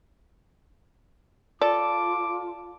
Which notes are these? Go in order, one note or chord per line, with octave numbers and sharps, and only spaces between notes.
F4 A4 D5 D6